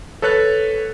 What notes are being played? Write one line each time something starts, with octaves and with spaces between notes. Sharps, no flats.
A4 B4 C#5 F#6 A6